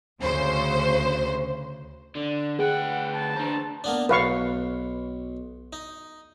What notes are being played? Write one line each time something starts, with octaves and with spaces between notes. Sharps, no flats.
D2 C#3 C5
D3 D5
D2 G#4 B4 F#5 G5
A5
D4 C5 A#5
A#3 B3 D4
B1 B4 F5 C#6
D#4